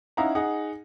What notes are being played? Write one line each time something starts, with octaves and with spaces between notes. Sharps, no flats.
C#4 D#4 E4 F5 F#5 A#5
D#4 G#4 F#5